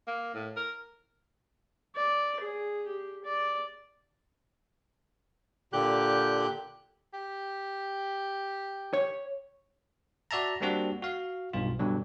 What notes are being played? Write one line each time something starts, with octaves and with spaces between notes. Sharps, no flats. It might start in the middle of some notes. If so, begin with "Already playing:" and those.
A#3
A2
A#4
D5
G#4
G4
D5
A#2 D3 G4 F#6 G6
G4
C#5
F#4 D5 E5 A5 A#5
G3 A#3 C4 D4 F#4
F#4 F5
B1 G2 F4
G2 B2 D3 F#3